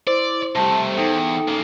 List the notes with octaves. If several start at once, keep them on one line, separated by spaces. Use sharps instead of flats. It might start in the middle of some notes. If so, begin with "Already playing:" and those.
E4 C5 D5
C3 G3 A3 G4 A5
E2 D#4 A4 G5
C#3 A#3